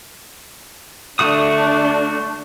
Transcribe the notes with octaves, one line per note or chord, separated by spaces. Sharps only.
D3 A3 D4 F#4 D#6